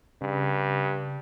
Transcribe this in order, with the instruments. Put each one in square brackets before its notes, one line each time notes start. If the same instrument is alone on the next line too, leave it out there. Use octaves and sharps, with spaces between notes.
[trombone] G2 [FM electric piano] C#3